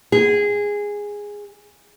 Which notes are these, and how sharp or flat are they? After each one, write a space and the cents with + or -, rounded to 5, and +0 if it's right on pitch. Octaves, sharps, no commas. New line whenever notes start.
G#4 -10